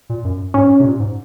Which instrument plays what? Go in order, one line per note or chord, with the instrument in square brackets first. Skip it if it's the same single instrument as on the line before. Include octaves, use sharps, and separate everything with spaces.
[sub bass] A#2
F#2
[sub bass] G#2 [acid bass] C#4
[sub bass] C3
A#2
G#2